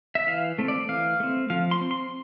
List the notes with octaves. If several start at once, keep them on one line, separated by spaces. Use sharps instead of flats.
E5
E3 F5
A3 C4
D5
E3 F5
A3 C4
F3 F5
C6
C4
C6